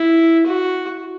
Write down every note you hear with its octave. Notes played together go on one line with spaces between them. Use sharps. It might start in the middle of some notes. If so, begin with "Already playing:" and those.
Already playing: E4
F#4